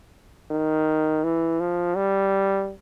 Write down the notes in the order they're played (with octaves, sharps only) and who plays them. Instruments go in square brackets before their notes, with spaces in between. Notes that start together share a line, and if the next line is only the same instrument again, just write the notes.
[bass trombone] D#3
E3
F3
G3